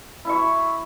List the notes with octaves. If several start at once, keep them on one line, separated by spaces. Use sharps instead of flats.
E4 E5 C#6